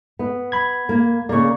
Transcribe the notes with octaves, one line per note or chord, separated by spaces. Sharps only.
B3
B5 G#6
A#3
C#3 A#3 D5 C#6